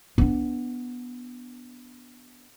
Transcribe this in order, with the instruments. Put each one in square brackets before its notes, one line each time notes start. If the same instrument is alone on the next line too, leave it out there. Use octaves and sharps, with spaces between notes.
[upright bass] B3 D4